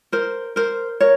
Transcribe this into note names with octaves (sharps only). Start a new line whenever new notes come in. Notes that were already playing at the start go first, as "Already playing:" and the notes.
A#4 C5
A#4 C5
A#4 C#5